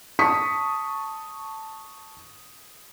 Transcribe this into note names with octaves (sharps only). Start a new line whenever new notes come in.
A5 C#6 D#6 B6 C#7